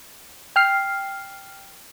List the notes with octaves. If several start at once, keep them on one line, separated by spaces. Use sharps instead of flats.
G5 F6 C7